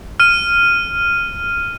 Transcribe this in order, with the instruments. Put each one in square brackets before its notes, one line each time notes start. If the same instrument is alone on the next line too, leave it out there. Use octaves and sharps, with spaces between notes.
[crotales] F6 D#7